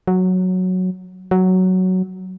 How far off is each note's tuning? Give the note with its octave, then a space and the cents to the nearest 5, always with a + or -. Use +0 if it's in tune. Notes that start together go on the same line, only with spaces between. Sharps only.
F#3 -5
F#3 +5